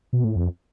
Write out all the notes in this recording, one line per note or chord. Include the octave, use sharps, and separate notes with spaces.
B2
A2
F2